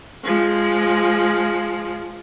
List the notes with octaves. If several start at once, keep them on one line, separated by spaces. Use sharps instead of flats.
F3 G#3